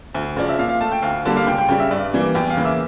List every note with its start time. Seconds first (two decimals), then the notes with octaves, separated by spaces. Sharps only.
0.14 D2
0.37 C#3 F3 D5
0.49 E5
0.59 A#2 F5
0.69 F5
0.81 A3 A5
0.92 G5
1.02 D2 F5
1.25 D3 G3 A#3 A5
1.37 F5
1.46 C#2 G5
1.58 G5
1.68 C#3 G3 G5
1.80 E5
1.91 G2 D5
2.13 E3 G3 A#3
2.35 E2 G5
2.50 F5
2.57 C#3 E3 A#3
2.65 E5